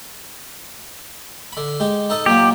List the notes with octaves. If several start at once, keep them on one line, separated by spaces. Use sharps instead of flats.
D3 B5
G#3 G4
D#4 A4 D#5
A#2 F#3 A#3 G4